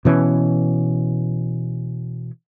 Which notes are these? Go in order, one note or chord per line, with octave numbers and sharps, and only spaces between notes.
B2 E3 C#4